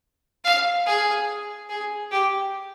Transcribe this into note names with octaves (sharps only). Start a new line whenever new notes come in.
F5
G#4
G#4
G4